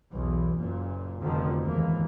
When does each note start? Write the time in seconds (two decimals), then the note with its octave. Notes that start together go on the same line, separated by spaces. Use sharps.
0.13 B1 E2
0.57 F#1 A#2
1.23 F1 B2 D3 D#3 F3
1.62 G#1 D#2 G#2 E3 A#3